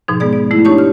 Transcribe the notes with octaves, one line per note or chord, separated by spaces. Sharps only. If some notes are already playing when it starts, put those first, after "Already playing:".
G#2 B2 F3 D#4
G#3 B3 G#4 D5
D5
A3 E4
D4 D#4 G4 C#5 A5 C#6
F6